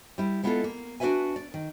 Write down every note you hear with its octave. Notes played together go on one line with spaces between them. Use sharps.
G3 E4
G#3 B3 E4 F4 G4 A4
A#3
D4 F#4 A4 B4 E5 G#5
D5
D#3